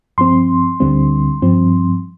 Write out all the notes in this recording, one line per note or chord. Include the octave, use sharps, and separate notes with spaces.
G2 F3 C4 C6
D2 D3 G3 C4
G2 F3 C4